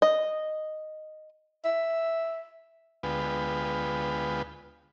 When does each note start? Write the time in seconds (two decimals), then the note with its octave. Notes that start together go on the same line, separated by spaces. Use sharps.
0.02 D#5
1.65 E5
3.03 D2 G#3 B3 F4 B4 G5